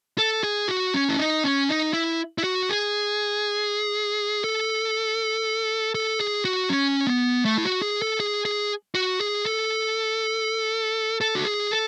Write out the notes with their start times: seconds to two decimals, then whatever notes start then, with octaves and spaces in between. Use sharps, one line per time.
0.18 A4
0.44 G#4
0.68 F#4
0.94 C#4
1.09 E4
1.18 D#4
1.44 C#4
1.69 D#4
1.93 E4
2.38 E4
2.44 F#4
2.69 G#4
4.44 A4
5.95 A4
6.20 G#4
6.45 F#4
6.69 C#4
7.07 B3
7.45 A3
7.58 E4
7.64 F#4
7.82 G#4
8.02 A4
8.20 G#4
8.45 G#4
8.95 F#4
9.21 G#4
9.46 A4
11.21 A4
11.35 F#4
11.46 G#4
11.71 A4